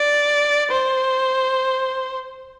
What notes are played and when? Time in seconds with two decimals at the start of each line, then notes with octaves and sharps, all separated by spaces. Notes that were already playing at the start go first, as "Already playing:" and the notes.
Already playing: D5
0.71 C5